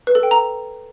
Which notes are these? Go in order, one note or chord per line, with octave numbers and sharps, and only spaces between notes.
B4
A4
G5
A#5